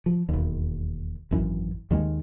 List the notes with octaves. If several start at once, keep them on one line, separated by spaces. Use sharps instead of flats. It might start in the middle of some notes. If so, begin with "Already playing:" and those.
F3
E1 D#2
G#1 F#2 E3
D#2 D#3 G3 G#3